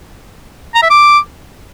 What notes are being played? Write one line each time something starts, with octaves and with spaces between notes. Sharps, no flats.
A#5
E5
D6